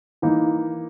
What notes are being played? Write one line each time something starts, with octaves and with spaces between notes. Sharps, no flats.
E3 A#3 D#4